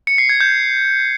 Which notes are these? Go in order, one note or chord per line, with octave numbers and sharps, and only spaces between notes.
C#7
C7
G#6
G6